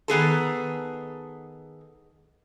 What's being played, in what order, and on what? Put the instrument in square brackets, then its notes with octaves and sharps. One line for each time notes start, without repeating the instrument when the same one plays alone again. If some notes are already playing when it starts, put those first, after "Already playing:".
[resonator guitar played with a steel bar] D#3 B3 G#4 A4